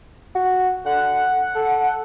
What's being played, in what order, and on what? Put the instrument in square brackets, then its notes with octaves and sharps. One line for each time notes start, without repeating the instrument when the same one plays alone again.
[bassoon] F#4
[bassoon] D3 [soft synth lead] F#5
[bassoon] A4